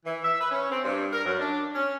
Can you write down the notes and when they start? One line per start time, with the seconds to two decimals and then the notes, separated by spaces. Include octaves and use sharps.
0.05 E3
0.24 E5
0.40 B4
0.51 C#4
0.71 C4
0.84 G2
1.13 A#4
1.25 F#2
1.40 D4
1.75 C#4